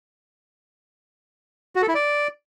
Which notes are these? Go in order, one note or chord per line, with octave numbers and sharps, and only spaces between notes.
F#4
A4
E4
D5